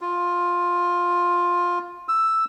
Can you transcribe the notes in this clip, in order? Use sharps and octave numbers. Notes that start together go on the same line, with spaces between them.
F4
E6